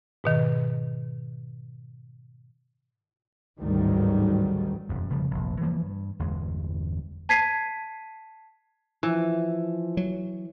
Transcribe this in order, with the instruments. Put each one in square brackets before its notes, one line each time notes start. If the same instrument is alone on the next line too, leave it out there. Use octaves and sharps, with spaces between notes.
[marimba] G#2 B2 D#3
[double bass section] A1 D2 G#2 D#3 F#3 G3
[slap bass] E1 F#2
F1 C#3 F3 G3
F1 A#1
E3 F3 G3 A#3
G2
G1 E2 G#3
[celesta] A5 G#6 B6 C7 D#7
[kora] E3 [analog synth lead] F3
[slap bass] F#3